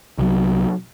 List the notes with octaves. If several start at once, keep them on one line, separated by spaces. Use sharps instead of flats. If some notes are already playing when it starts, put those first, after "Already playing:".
C2 F#3